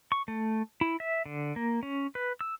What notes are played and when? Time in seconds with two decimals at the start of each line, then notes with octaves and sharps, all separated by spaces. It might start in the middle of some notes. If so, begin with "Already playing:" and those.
0.12 C#6
0.28 A3
0.81 E4
1.00 E5
1.26 D3
1.56 A#3
1.83 C#4
2.15 B4
2.41 E6